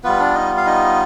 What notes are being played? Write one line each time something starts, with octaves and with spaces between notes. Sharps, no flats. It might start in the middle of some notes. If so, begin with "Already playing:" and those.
G3 B3 F4 B4
D4 D5
D#4 D#5
F5
D#4 D#5